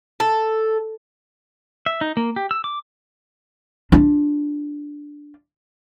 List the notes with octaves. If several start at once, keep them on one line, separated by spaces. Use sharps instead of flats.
A4
E5
D#4
A#3
G4
E6
D6
D4 F4